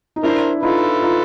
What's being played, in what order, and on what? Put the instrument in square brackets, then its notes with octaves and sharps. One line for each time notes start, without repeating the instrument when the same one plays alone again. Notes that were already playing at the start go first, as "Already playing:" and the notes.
[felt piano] D#4
[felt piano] D4 E4 [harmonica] A#4 C5
[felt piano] D#4 F4 [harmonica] A4 B4
[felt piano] D#4 F4